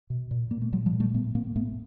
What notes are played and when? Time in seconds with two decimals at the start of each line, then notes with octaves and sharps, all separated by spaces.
0.10 B2
0.31 A#2
0.51 A#2 A#3
0.62 A3
0.72 A#2 F#3 G#3
0.86 F3 G3
0.93 A#2
1.00 G3 A3
1.14 A2 A3 B3
1.35 A2 A#3 C4
1.56 A2 A3 B3